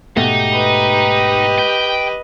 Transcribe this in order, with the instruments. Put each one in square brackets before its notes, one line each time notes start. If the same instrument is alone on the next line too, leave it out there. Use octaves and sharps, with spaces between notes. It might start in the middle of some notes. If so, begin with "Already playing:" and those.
[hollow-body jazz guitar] G#2 B2 A3 [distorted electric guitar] D#4 [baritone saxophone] G4
[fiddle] B4 D#5
[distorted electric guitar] G5